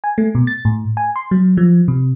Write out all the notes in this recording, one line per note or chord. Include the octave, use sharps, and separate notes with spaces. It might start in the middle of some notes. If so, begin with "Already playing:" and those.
G#5
A3
B2
A6
A2
G#5
C6
F#3
F3
C3